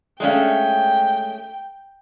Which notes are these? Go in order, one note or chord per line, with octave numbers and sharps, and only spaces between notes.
G#3 A3 C#4 A4 D5 F5 G5